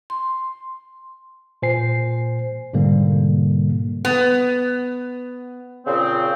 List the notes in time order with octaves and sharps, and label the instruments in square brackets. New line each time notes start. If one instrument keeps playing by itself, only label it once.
[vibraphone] C6
[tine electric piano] A#2 C5 G#5 C7
G#2 B2 D3 G3 A#3
[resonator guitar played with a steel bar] B3
[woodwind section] A#2 C#3 C4